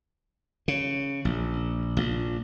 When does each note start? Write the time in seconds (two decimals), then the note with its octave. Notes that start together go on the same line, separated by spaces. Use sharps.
0.68 C#3
1.25 A#1
1.97 A#1